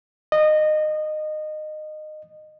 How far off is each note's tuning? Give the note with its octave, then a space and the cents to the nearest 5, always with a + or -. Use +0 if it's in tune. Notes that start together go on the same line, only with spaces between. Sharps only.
D#5 -20